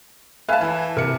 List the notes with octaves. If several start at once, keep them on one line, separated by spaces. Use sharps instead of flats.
B4 E5 F5 G#5 A5
E3 G#5
C3 A#4 C#7